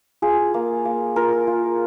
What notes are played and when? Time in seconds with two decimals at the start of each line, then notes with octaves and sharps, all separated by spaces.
0.22 F4 G#4
0.54 A#3
0.85 A#3
1.16 F4 A#4
1.47 F4